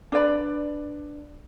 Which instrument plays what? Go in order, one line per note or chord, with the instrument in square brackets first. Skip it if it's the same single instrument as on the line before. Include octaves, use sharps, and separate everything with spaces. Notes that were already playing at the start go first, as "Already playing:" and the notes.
[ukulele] D4 B4 D5 B5